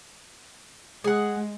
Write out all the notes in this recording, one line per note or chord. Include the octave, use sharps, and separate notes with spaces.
G#3 G#4 F#5